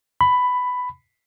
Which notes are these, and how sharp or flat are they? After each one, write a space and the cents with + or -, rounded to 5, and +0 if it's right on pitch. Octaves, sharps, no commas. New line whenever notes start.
B5 +10